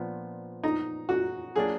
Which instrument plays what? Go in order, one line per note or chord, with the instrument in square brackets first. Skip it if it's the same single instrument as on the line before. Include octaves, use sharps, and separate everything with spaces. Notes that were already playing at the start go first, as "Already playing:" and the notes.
Already playing: [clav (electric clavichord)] A#2 F3 B3 D4
[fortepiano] D#4
F#4
[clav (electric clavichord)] F#3 A#3 D4 [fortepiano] G#4